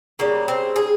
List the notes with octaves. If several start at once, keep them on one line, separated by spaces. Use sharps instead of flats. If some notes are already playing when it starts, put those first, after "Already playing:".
C#3 G3 A#3
C4
G#4